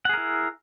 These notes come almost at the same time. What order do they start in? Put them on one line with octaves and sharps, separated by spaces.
F#5 G#4 A#4 E4